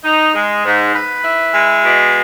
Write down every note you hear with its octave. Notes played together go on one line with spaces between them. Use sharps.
D#4
G#3
G#2
B4
E4
G#3
B2